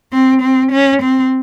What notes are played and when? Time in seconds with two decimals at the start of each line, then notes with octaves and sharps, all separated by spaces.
0.12 C4
0.42 C4
0.72 C#4
1.02 C4